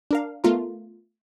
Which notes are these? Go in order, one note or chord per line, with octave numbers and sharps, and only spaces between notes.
D4 A#4 F5
A3 B3 F4 A#4